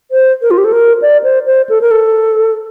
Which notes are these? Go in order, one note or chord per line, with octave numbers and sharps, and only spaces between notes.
C5
A#4
F4
G4
A4
A#4
D5
C5
C5
A4
A#4
A4